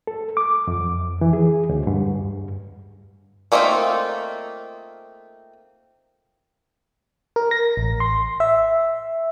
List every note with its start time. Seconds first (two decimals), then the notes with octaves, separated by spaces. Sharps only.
0.07 A4
0.37 D6
0.67 F2
1.21 E3
1.33 G#4
1.69 D2
1.87 G2
3.52 A3 A#3 C4 D#4 F4
7.36 A#4
7.51 A#6
7.77 A1
8.00 C6
8.40 E5